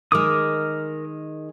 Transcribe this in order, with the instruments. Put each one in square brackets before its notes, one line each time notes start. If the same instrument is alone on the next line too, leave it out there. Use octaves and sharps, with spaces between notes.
[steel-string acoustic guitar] D#3 G#3 [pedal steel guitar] A#4 D6 D#6